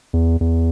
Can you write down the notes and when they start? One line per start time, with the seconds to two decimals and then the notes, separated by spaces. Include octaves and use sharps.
0.13 E2
0.41 E2